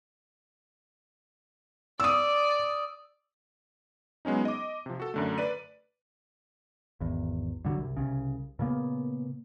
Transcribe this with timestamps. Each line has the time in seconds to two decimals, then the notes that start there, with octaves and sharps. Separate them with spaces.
2.00 D5 D#6 E6
4.25 F#3 G#3 B3 C#4 D#4
4.45 D#5 D6
4.86 C3 F3
5.00 F#4 A4
5.14 F#2 D3 A3
5.38 B4 D5 D#7
7.01 G#1 E2
7.65 G2 D3 D#3 F#3
7.79 C2
7.97 C2 C#3
8.59 A#2 C#3 A#3 B3